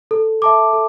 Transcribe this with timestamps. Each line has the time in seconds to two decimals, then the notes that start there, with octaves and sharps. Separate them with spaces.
0.11 A4
0.42 E5 A5 D6
0.73 A4